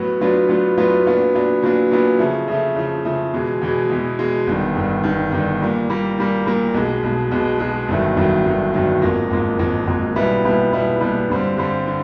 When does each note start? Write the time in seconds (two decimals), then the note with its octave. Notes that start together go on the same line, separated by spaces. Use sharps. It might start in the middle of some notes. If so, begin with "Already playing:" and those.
Already playing: A2 F#3 B3
0.20 A2 F#3 B3 D4 F4
0.48 A2 F#3 B3 D4 F4
0.77 A2 F#3 B3 D4 F4
1.05 A#2 F#3 B3 D4
1.34 A#2 F#3 B3 D4
1.62 A#2 F#3 B3 D4
1.91 A#2 F#3 B3 D4
2.19 C#3 F3 A3
2.48 C#3 F3 A3
2.76 C#3 F3 A3
3.05 C#3 F3 A3
3.34 E2 B2 G#3
3.61 E2 B2 G#3
3.90 E2 B2 G#3
4.19 E2 B2 G#3
4.47 G1 G2 D#3
4.75 G1 G2 D#3
5.04 G1 G2 D#3
5.32 G1 G2 D#3
5.61 A#2 G3 A#3
5.89 A#2 G3 A#3
6.17 A#2 G3 A#3
6.46 A#2 G3 A#3
6.74 B1 B2 G#3
7.03 B1 B2 G#3
7.31 B1 B2 G#3
7.60 B1 B2 G#3
7.88 G1 G2 D#3 F#3 A3
8.16 G1 G2 D#3 F#3 A3
8.46 G1 G2 D#3 F#3 A3
8.74 G1 G2 D#3 F#3 A3
9.02 G#1 G#2 F3 A#3
9.30 G#1 G#2 F3 A#3
9.58 G#1 G#2 F3 A#3
9.87 G#1 G#2 F3 A#3
10.15 B1 A#2 G3 B3 E4
10.44 B1 A#2 G3 B3 E4
10.72 B1 A#2 G3 B3 E4
11.00 B1 A#2 G3 B3 E4
11.29 G2 D3 G3 C4
11.57 G2 D3 G3 C4
11.87 D3